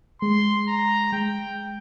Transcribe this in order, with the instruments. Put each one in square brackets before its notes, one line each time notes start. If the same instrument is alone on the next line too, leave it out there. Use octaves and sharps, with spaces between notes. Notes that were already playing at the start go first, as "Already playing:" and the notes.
[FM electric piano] G#3 [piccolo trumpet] C6
[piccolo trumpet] A#5
[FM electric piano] G#3 [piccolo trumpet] G5